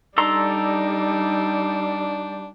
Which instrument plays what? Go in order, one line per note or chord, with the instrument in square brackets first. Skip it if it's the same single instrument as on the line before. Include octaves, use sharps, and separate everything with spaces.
[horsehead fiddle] G3 [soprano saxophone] D4 [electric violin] D#4 [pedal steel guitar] A4 A#5 C6